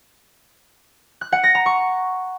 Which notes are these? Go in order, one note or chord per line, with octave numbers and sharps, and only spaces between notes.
F#6
F#5
A#6
A#5
C#6